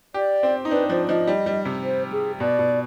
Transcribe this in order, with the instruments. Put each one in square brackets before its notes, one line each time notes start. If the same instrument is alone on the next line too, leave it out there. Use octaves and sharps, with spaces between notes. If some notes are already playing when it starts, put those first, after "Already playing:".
[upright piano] G4 [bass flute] D5
[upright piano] C4
D#4
[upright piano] D4 [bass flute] B4
[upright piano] F3 [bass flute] C5
[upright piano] F3 [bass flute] D#5
[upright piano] G3
G3
C3
[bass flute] C5
G#4
[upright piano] B2 [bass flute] D5
[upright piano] B2